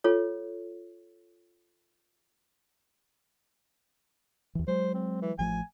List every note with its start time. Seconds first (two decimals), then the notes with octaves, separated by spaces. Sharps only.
0.04 F4 A4 C#5
4.55 D#2 E3
4.68 F#3 G#3 C5
4.94 C4
5.22 E3
5.39 A1 F3 A3 G#5